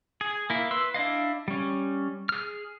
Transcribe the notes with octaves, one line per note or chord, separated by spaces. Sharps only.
G#4
A#3 E4
B4 C6 E6
D4 E4 D#5 F5
G3 C#4
G#4 F6